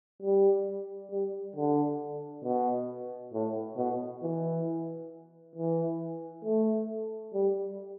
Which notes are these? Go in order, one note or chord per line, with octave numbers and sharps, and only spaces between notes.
G3
G3
D3
B2
A2
B2
E3
E3
A3
G3